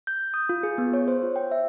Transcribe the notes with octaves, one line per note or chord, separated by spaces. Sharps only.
G6
D#6
F4
G#4
B3
C#5
C5
F4
G5
E5